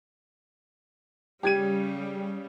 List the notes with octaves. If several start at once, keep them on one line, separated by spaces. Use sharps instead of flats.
C#3 G3 G4 G#6 D#7